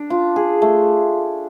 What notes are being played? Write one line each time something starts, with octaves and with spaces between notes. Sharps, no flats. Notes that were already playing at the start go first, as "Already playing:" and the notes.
Already playing: D4
F4
G#4
A3